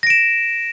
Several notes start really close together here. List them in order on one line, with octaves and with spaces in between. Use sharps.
A#6 D7 E7